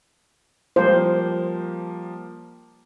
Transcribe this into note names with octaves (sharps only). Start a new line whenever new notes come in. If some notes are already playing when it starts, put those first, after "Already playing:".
F3 G3 A#3 C5